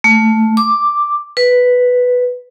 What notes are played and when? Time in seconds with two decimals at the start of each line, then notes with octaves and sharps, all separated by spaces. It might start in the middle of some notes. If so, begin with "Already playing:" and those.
0.04 A3
0.57 D6
1.37 B4